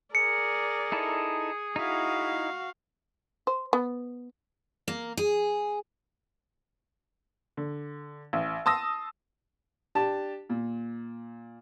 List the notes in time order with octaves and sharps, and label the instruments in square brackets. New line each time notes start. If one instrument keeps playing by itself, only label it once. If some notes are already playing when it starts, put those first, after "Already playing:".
[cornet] G#4 [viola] A#4 D5 [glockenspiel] C#7
[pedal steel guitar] D#4 E4 A4
[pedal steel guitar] D#4 E4 [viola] F#4 F5
[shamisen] C5
B3
[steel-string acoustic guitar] A#3
G#4
[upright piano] D3
A1
A5 C6 D#6 E6 A#6
[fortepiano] D4 G4 A5
A#2